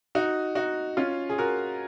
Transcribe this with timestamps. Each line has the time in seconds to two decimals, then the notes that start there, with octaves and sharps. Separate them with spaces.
0.15 D#4 F#4
0.55 D#4 F#4
0.97 C#4 F4
1.29 G#4
1.38 F#4 A#4